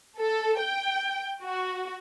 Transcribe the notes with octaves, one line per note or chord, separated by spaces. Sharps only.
A4
G5
F#4